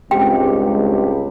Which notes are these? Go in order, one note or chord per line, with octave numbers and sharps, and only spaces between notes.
C#2 G2 G#3 C4 G4 G5